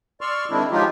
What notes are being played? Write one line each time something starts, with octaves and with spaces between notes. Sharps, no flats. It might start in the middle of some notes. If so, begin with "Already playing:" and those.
D5 C6 C#6 E6 F6
D#3 G#3 C4 D4 E4
F3 F#3 G#3 D#4 F4 G4